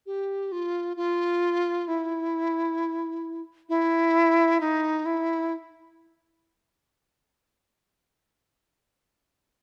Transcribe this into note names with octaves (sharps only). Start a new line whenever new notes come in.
G4
F4
F4
E4
E4
D#4
E4